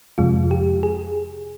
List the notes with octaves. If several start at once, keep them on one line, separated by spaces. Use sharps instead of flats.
F2 C3 F3 G#3 F4
G4
G#4